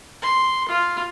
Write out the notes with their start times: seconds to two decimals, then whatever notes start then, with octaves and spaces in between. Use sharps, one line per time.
0.22 C6
0.69 F4